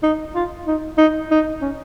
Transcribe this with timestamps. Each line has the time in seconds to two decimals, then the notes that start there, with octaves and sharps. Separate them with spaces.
0.03 D#4
0.35 F4
0.67 D#4
0.98 D#4
1.31 D#4
1.62 C#4